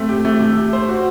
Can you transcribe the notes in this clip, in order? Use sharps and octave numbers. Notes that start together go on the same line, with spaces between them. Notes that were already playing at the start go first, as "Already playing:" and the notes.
Already playing: A3 C4
G4
A3
A3
G4
C5
F#4